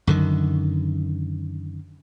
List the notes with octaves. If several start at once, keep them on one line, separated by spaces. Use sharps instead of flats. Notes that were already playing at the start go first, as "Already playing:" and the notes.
F#2 D3 D#3